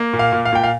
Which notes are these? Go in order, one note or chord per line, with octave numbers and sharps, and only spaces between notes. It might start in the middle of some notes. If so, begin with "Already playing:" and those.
Already playing: A#3
A#2
F5
A#2
F5
A#2 G5
F5